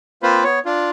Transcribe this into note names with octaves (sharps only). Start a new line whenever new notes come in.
A#3 C4 F4 B4 C5
B3 C#5
D4 F4